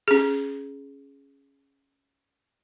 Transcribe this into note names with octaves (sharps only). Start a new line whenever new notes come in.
C#4 G#4